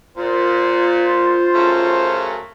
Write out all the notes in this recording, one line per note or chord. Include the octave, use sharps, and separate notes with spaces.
A#2 F4 C5
F#2 C#3 A3